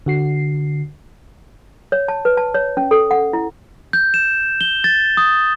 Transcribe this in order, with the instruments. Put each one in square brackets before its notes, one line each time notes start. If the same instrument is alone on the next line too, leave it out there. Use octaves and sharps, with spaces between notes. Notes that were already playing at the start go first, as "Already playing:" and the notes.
[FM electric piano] D3 F#4 C7
[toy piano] C#5
A5
B4
A5
C#5
C#4
A4
F#5
E4
[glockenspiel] G6
E7
G7
A6
D#6